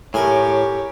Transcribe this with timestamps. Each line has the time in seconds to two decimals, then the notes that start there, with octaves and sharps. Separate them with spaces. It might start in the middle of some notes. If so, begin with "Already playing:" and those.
0.14 A2 G4 A#4 C#5 G#5